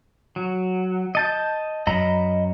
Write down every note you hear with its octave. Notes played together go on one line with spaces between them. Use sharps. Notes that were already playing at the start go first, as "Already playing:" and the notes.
F#3
D#5 A5 G6
F#2 F#3 D#5 A#5 B5